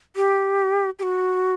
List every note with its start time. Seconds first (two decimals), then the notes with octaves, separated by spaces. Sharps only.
0.16 G4
0.99 G4
1.03 F#4